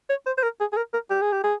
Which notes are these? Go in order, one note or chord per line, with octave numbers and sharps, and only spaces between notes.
C#5
C5
C5
A#4
G#4
G#4
A#4
A#4
G4
G#4
G4
G#4